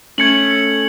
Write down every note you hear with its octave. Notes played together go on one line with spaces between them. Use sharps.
A3 C#4 G#6 C#7 F#7